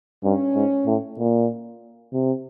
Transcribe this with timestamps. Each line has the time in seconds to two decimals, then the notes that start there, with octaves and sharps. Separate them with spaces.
0.23 G2 C#4
0.55 G#2
0.86 A2
1.19 A#2
2.13 C3